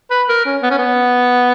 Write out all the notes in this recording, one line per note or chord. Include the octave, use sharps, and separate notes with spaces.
B4
A#4
C#4
B3
C#4
B3